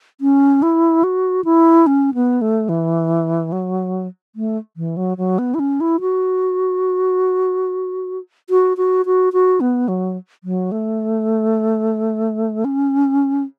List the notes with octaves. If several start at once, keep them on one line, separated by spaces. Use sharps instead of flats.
C#4
E4
F#4
E4
C#4
B3
A3
E3
F#3
A3
E3
F#3
F#3
B3
E4
C#4
E4
F#4
F#4
F#4
F#4
F#4
B3
F#3
F#3
A3
C#4